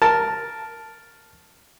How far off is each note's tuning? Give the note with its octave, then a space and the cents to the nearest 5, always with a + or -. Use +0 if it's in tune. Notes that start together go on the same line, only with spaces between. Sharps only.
A#4 +0 A5 +0